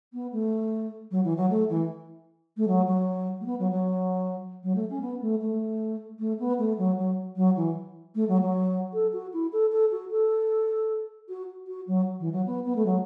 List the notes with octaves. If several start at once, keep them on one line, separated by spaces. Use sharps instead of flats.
B3
A3
F#3
E3
F#3
A3
E3
A3
F#3
F#3
A3
B3
F#3
F#3
F#3
A3
C#4
B3
A3
A3
A3
B3
A3
F#3
F#3
F#3
E3
A3
F#3
F#3
A4
F#4
E4
A4
A4
F#4
A4
F#4
F#4
F#3
E3
F#3
B3
B3
A3
F#3